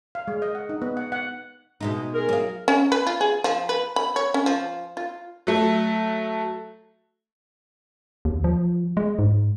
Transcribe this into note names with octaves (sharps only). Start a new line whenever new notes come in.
F5
G#3
D#5
F#5
D#4
B3
F#5
F#5
B2 G#3 D#4
G#4 A#4
F#3 F5
C#4
B4
F4
G#4
F3
B4
B5
C#5
C#4
F3
F4
F#3 A3
D#2
F3
G#3
G#2